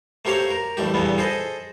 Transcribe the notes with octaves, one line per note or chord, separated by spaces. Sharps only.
A3 A#3 G4 C5 C#5 F5
A#4
A1 G2 A3 G4
E2 G2 A#2 A3 B3
G#4 A4 C5 D#5